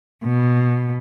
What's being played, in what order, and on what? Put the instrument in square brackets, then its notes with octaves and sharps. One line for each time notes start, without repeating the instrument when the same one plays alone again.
[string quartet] B2